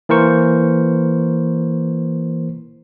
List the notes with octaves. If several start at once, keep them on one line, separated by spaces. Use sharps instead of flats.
E3 A#3 A#4 C5 C#6